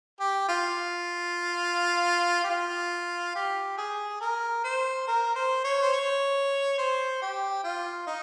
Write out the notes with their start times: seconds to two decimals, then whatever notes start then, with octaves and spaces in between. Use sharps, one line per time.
0.20 G4
0.49 F4
2.44 G4
2.50 F4
3.35 G4
3.78 G#4
4.21 A#4
4.64 C5
5.08 A#4
5.36 C5
5.64 C#5
5.82 C5
5.93 C#5
6.78 C5
7.22 G4
7.64 F4
8.07 D#4